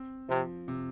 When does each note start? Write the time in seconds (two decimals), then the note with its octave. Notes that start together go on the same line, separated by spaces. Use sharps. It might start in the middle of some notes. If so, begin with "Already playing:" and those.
Already playing: C4
0.29 C3 F3
0.68 C3